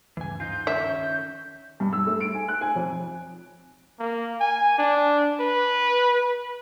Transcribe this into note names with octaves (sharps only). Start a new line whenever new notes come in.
D2 G2 C#3 E3 G#5
G#2 D#4 F4 G6
D#3 C#4 E5
G2
E6
A3
D7
G#5
F#6
G#5
F2
A#3
G#5
D4
B4